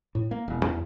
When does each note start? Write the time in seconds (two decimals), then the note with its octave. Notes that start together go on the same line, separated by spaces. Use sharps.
0.15 A2
0.31 A#3
0.48 E1
0.65 E2